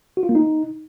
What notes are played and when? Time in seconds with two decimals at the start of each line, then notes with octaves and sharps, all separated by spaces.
0.17 F#4
0.23 F4
0.29 A#3
0.35 D#4